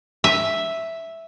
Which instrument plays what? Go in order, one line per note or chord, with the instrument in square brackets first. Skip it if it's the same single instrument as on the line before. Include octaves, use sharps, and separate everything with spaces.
[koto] E5